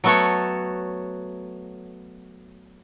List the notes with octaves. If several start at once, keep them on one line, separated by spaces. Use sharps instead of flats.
F#3 A3 B3 F#4 A4 C#5